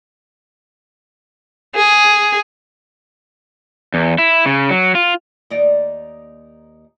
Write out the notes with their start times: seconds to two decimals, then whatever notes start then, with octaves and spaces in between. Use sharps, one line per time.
1.75 G#4
3.94 E2
4.18 E4
4.46 C#3
4.70 F#3
4.95 F4
5.50 D#2 D#4 D5